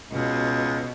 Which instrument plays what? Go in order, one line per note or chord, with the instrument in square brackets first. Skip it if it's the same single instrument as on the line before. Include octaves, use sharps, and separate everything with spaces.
[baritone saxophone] C#2 [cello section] B2